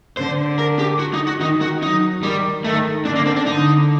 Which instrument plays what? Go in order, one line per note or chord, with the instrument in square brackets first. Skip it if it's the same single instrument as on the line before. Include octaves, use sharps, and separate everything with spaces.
[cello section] D3 [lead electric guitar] C5
[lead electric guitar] A#4
G4
F#4
D#4
F#4
[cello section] D#3 [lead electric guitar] D#4
[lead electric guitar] F#4
[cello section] F#3 [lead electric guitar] D#4
[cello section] D#3 [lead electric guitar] G3
[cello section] D#3 [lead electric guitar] A3
[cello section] D3 [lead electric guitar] D4
[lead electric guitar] A#3
C4
D4
[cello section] D3 [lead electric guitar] D#4